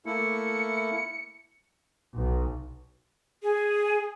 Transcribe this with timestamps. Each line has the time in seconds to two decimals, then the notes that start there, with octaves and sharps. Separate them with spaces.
0.06 A3 A#3 E4 C#7
2.14 B1
3.43 G#4